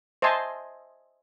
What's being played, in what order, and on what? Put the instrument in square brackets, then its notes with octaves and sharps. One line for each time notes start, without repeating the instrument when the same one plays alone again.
[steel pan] C5 D#5 E5 G#5 A5 C6